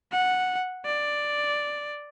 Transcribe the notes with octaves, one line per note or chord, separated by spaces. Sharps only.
F#5
D5